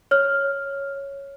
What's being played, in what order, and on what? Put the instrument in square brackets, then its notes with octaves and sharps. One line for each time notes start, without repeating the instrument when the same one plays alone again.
[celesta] C#5 F6